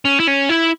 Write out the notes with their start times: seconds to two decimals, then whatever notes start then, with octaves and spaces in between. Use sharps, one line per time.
0.05 C#4
0.20 E4
0.28 C#4
0.49 E4